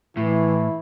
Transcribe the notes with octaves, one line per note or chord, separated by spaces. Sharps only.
A2 E3 E4